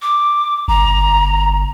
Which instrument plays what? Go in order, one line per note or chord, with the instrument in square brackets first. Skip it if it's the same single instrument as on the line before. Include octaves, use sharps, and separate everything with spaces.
[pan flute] D6
[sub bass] G1 [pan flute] A#5